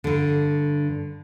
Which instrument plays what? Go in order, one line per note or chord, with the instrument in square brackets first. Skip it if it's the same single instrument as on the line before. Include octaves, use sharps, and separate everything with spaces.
[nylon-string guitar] G2 D3